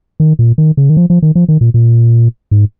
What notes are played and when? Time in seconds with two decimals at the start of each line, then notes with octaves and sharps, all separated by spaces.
0.20 D#3
0.39 A#2
0.58 D#3
0.77 C#3
0.90 D#3
0.97 F3
1.10 F3
1.22 D#3
1.35 F3
1.49 D#3
1.61 A#2
1.74 A#2
2.51 G#2